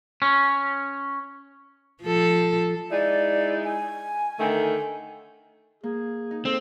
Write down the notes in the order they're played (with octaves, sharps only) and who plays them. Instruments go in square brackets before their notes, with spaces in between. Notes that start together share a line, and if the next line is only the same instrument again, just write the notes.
[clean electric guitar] C#4
[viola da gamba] F3 A4
[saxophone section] G#3 D#4 E4 [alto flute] D5
[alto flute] G#5
[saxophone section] D3 D#3 A3
[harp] A#3 [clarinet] G#4
[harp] D#4
[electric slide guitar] C4 [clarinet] A4